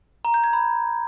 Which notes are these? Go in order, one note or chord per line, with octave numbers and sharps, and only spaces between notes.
A#5
G6
G#6
B5